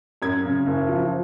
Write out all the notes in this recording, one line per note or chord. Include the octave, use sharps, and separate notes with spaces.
F#2 G#6
C#3
F#1
F3